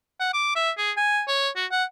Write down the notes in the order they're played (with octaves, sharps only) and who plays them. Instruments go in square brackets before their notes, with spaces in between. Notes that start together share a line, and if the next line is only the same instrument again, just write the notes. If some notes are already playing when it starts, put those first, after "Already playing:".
[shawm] F#5
D6
E5
G#4
G#5
C#5
F#4
F#5